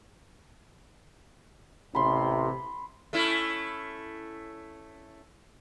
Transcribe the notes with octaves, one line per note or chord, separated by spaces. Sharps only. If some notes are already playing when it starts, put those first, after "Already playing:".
A1 C3 B5 C6
A3 C#4 E4